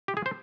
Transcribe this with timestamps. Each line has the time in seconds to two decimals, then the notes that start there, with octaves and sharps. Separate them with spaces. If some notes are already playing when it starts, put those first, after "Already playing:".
0.08 G4
0.17 G#4
0.26 C5